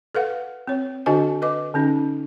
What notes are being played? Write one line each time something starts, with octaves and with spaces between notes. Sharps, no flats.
A4 B4 F5 F#5
C4 C#5
D3 D4 F#4 C5 D#5 G#5
B4 D#5 D6
D3 C#4 D#4